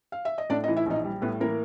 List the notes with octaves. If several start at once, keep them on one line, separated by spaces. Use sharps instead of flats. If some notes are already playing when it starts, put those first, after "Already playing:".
F5
E5
D#5
A2 D4 D5
D#4 D#5
E3
E4 E5
A#1 D#4 D#5
G3
A2 B3 B4
E3 A#3 A#4